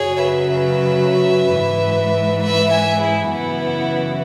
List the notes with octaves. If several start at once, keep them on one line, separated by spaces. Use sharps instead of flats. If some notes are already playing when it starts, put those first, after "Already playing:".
Already playing: F#2 C#3 F#3 G#4 C#5
B4 E5
G#2 E3
B4 E5
E5 G#5
E4 G#4
F#2 C#3 E3 B3 E4